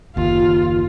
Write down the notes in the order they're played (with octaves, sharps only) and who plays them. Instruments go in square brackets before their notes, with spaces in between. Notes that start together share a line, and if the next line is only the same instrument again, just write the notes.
[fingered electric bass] F#1 D#2 [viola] F4